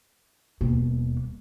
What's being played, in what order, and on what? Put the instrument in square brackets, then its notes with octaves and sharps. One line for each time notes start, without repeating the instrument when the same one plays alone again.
[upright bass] D#1 B2